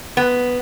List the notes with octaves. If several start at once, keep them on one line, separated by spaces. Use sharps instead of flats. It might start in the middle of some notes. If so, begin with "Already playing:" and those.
B3